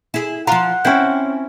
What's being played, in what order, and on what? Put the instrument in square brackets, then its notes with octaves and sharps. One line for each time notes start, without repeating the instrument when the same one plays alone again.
[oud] E4 G#4
[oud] F3 F4 [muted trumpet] F#5 [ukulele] A#5
[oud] C4 [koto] C#4 E4 [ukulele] C5 G5